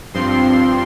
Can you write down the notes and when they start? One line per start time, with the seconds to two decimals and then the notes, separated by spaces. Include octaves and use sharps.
0.14 G2 F3 C4 C6